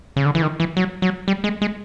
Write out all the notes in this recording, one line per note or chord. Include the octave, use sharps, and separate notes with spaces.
C#3
D3
E3
D#3
E3
F#3
F#3
G3
G#3
G#3